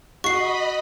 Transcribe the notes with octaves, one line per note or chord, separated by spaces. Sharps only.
F#4 D#5 B5 C#6 C7